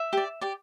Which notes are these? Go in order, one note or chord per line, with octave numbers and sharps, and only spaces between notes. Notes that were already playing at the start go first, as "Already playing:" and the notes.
Already playing: E5
G4 D5
G4 D5